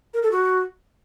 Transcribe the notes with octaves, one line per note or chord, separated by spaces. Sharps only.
A#4
A4
F#4